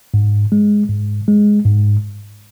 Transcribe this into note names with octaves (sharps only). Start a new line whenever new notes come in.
G#2
G#3
G#2
G#3
G#2